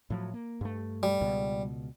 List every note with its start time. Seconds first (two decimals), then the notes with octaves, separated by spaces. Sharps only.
0.10 A2 F3 F#3
0.34 A#3
0.61 G2 A3
1.03 G3
1.21 C#2 B2